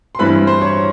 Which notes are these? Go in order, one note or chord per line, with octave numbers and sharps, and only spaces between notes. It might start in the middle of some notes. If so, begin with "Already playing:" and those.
C6
G2 E3 G3 C4 E4 B4 B5
C5 C6
C#5 C#6